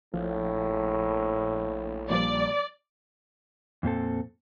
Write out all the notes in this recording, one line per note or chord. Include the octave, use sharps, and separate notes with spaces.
A#1 A2 F3
A#2 F3 G3 D5
F2 A#2 C4 A4